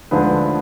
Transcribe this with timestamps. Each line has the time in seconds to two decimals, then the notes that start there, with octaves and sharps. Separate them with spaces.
0.11 D2 D3 F3 G#3 B4